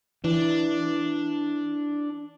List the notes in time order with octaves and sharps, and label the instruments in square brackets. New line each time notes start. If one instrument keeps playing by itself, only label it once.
[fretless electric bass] E3 [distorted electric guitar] D4